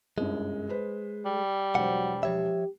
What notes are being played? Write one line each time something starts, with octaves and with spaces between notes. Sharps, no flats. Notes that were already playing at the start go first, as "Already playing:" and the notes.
G1 C2 F#2 G#3
B4 C5
G3
E1 F#3 C5 F#5
F3 G4 C#5 E5